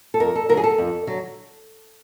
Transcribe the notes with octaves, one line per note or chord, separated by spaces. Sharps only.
A4
F2 A#4
A4
D3 F#3 A#4
G#4
A4
F2
D3 F#3